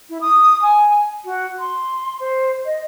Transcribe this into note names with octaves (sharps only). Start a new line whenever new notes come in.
E4
D#6
G#5
F#4
C6
C5
D#5